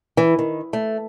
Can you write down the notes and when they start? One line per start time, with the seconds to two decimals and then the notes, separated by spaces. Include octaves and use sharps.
0.17 E3
0.39 D#3
0.73 A3